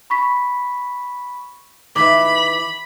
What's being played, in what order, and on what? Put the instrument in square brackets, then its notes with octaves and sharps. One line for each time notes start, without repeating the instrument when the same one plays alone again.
[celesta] B5 C#6 B6
[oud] D#3 E3 E5 [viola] B5 [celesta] D6